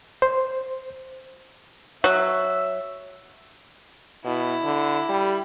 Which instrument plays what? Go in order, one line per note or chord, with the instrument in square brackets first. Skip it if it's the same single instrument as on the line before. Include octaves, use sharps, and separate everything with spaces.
[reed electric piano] C5
[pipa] F#3 [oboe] E5
[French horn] B2 [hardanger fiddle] E4
[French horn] D3
G3